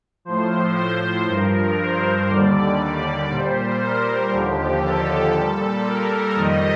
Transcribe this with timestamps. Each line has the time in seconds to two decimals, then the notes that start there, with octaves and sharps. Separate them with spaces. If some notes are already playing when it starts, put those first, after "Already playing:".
0.25 A2 F3 C5
0.77 C5
1.28 G2 F3 A#4
1.78 C5
2.29 D#2 D3 G3 D5
2.79 D5
3.30 A#2 G3 C5
3.81 A#4
4.32 D#2 D3 F3 G4
4.83 A4
5.33 A#2 G3 A4
5.84 A#4
6.35 F2 D#3 G3 D#5